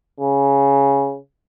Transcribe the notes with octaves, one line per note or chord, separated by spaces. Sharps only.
C#3